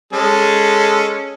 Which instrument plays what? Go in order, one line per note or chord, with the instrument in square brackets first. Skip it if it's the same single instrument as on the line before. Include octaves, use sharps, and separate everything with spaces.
[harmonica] G#3 C#4 A4